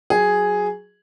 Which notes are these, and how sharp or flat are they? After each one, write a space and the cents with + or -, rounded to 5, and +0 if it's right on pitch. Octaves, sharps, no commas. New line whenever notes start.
F#3 +0 G#4 +0